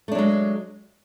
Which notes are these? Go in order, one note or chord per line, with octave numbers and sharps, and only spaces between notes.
F#3 G#3 A3 D4